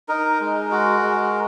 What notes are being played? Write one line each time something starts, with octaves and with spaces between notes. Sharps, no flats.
D#4 A#4
G#3
F#4
G#3